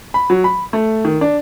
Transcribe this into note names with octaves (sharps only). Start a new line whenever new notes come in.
B5
F#3
B5
A3
D#3
D4